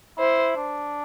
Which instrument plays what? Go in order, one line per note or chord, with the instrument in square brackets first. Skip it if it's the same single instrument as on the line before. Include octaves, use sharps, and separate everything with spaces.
[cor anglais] E4 [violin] C5
[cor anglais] D4